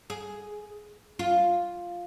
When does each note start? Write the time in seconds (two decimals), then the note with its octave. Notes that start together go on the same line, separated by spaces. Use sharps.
0.10 G#4
1.19 F4